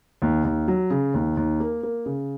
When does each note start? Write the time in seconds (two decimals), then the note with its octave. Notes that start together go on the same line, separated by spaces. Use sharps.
0.22 D#2
0.45 D#2
0.68 F#3
0.90 C#3
1.14 D#2
1.37 D#2
1.60 A#3
1.83 A#3
2.06 C#3